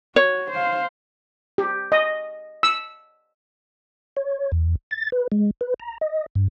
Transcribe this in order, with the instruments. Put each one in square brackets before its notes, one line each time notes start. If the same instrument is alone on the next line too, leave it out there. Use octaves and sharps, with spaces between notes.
[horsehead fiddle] F#4 [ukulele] C#5
[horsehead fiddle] C5 F5
[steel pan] G4
D#5
E6
[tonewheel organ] C#5
E2
A6
B4
G#3
B4
A#5
D#5
G2